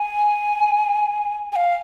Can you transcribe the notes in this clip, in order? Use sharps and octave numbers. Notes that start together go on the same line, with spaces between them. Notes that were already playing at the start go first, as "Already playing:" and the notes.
Already playing: G#5
G#5
F5